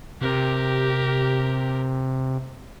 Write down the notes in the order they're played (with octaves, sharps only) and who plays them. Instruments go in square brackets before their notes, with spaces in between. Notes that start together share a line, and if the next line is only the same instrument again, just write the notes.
[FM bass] C3 [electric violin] G4 A#4